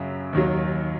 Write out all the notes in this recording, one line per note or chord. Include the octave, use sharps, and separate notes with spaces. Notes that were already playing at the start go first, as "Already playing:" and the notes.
Already playing: F#2 C#3 F#3
D#2 D#3 F#3